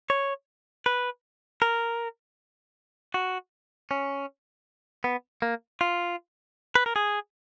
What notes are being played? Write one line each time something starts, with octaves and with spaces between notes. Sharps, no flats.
C#5
B4
A#4
F#4
C#4
B3
A#3
F4
B4
A#4
G#4